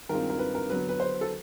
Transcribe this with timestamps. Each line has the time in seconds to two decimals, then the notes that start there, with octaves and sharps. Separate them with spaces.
0.09 G2 D#3 G#3 C4 F4 A#4
0.30 A#4
0.39 B4
0.55 A#4
0.70 D3 F#3 B3 B4
0.89 B4
1.00 C5
1.21 A4